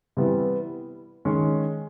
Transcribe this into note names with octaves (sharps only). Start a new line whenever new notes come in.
C3 E3 G3 B3
D#3 G#3 C#4